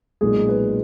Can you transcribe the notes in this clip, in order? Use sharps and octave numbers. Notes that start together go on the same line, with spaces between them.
B1 A#2 G#3 G#4
B4